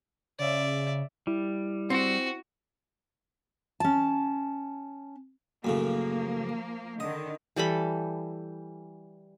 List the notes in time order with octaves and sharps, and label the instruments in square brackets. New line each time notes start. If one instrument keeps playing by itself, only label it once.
[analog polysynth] C#3 [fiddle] D5 E5
[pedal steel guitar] G3 [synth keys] E4
[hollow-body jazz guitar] C4 [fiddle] F#4
[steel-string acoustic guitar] C#4 A5
[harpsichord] F#2 A2 C#3 [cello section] F3 A#3
[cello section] D3 D#3 [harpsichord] D#5
[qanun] E3 G3 A4 B5